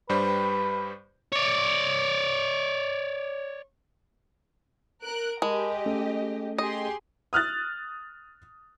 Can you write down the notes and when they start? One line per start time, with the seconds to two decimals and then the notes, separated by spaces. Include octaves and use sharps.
0.09 G2 G3 B4 C5
1.33 C#5 D5
5.02 A#4 F#6 D7
5.42 G#3 G4 A#4 D#5 A5 B5
5.86 A3 C#4 A4
6.58 G4 G#4 D#5 C6
7.33 D#6 F6 F#6 A6